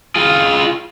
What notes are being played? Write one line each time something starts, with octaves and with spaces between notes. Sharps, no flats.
F4 G#4